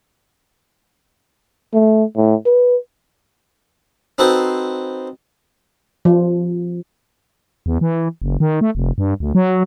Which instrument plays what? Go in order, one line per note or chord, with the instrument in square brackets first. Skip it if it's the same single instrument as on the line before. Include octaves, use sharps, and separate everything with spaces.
[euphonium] A3
A2
B4
[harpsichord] C4 D#4 F#4 A4 B4 C5
[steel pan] F3
[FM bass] E2
E3
F#1
D#3
A3
F1
G2
D2
F#3